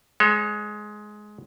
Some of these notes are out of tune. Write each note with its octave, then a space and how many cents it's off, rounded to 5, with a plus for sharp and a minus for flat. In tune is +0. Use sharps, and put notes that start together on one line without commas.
G#3 +15 C#5 -35